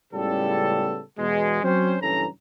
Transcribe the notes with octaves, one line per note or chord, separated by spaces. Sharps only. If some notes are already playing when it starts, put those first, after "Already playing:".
C#2 A2 C#3 G3 B3 A4
E2 B2 G#3
F#3 C4 C#4 C5
F#1 G2 E3 C#4 A4 A#5